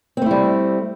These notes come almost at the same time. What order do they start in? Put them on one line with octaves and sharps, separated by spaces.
C4 A3 E4 G3